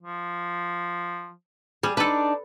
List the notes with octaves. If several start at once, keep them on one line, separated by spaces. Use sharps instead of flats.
F3
G3 G#4
D4 D#4 A4 B4 D5